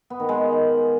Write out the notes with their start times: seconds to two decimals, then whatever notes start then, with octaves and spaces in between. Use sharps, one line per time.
0.10 B3
0.20 D#3
0.29 G#3